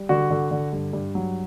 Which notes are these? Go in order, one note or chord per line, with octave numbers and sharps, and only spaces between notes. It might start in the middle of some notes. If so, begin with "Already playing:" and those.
Already playing: G3
D3 F#4
D3
D3
G2
G2
F#3